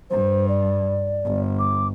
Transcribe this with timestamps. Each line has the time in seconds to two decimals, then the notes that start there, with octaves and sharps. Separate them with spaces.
0.10 G2 C5
0.48 D5
1.25 G1
1.59 D6